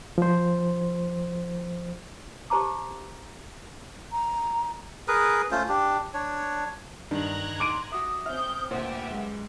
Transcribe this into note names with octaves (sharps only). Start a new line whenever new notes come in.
F3 C5
G4 C5 A5 A#5 D6
A#5
G#4 A#4 B4
A3 C#4 F4 C5
D4 G4
D4 C#5
G2 D#3 A#5 F#6 G#6
C6 D6 D7 D#7
F#4 E5 D#6
C4 C#4 E5 F6 G6
D2 A#2 G4 B4 C5 E5 F#5
F#2 G#3